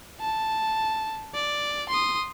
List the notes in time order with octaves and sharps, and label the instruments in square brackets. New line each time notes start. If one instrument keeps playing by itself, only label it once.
[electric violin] A5
D5
C6 D#6